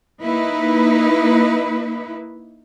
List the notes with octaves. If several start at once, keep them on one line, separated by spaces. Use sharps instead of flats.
A#3 D#4 E4 B4